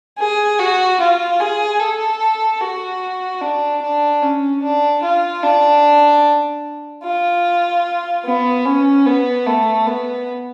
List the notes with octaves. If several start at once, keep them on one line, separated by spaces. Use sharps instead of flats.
G#4
F#4
F4
G#4
A4
F#4
D4
D4
C#4
D4
F4
D4
F4
B3
C#4
B3
A3
B3